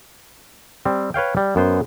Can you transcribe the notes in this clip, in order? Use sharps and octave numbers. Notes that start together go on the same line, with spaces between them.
G3 C4
B4 C#5 F5 G5
G3
F#2 B3 C5